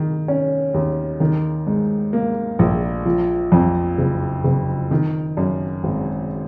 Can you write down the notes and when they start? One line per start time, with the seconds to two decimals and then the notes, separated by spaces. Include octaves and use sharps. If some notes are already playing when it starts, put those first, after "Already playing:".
Already playing: D#3
0.28 C#4
0.74 D#2
1.20 D#3
1.67 G#2
2.13 A#3
2.59 A#1
3.05 F3
3.52 F2
3.98 F#1
4.44 F#1
4.91 D#3
5.37 F#2
5.84 G#1